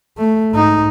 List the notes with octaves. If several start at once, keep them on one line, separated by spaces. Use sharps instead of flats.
A3
G#2 D#4